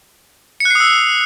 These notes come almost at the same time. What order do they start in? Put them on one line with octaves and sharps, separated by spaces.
C#7 F#6 C7 D#6 E6